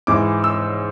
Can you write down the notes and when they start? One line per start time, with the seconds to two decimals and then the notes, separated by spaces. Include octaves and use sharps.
0.07 G#2 E3 D6
0.44 E6